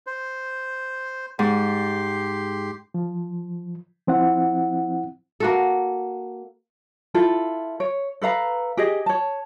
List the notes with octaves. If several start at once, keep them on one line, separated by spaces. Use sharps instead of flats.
C5
G#2 G4 C6
F3
F3 C4 E4 F#5
A#3 F#4 A4
E4 F4 A4
C#5
A4 B4 F5 A#5
G4 G#4 D#5
C#5 A5